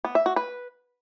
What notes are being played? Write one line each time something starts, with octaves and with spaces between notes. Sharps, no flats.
B3
E5
F#4
B4